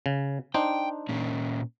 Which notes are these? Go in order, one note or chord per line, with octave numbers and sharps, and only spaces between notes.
C#3
D4 D#4 C5 G5
A#2 A#3 C#4